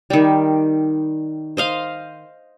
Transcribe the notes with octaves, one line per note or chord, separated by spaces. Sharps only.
D#3 G3
C5 D#5 F5